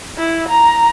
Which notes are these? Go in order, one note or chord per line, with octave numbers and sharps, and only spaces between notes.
E4
A#5